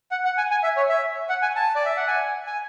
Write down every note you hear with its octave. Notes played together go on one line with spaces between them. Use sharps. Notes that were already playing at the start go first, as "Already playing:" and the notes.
F#5
F#5
G#5
G#5
E5
C#5
E5
F#5
G#5
A5
D5
E5
F#5
G#5
G#5